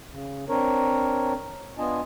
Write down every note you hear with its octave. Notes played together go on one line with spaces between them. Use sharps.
C#3
C4 D4 A#4 C#5
B3 D4 F4 D#5 G#5 A5